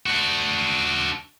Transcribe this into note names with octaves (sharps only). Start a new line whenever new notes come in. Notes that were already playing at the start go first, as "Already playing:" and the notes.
D4 F#4